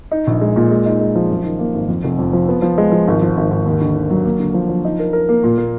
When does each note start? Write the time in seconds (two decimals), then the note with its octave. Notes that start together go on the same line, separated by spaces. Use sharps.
0.11 D#4
0.27 A#1
0.41 G#3
0.56 A#2
0.71 G#3
0.86 D#4
1.01 G#3
1.16 F3
1.30 F#2
1.44 D#3
1.59 A#3
1.74 G#1
1.89 F2
2.04 F1
2.19 F2
2.33 F3
2.49 B3
2.62 F3
2.78 G#3
2.92 F3
3.08 G#1
3.22 F3
3.37 G#1
3.51 G#1
3.66 D#2
3.81 D3
3.95 D#2
4.10 F#3
4.25 A#3
4.39 D3
4.54 F3
4.69 F3
4.85 D#4
4.99 A#4
5.13 A#4
5.29 A#3
5.44 A#2
5.58 A#3